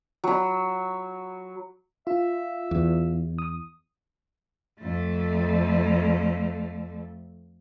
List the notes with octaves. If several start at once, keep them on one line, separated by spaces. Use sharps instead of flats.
F#3 B5
F4 E5
E2
D#6
F2 A3